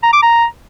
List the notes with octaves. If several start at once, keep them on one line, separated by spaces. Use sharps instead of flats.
A#5
D6
A#5